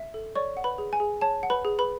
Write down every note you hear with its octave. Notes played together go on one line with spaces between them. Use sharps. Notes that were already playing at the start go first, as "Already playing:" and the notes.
Already playing: E5
A4
C#5 D5 C#6
F#5
B4 B5
G#4
G#5
G#4
C#5 A5
F#5
B4 B5
G#4
B4 B5